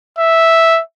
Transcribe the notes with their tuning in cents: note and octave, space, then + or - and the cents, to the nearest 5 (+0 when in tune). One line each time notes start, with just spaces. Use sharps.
E5 -5